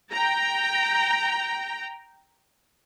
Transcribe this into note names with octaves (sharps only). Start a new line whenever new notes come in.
G5 A#5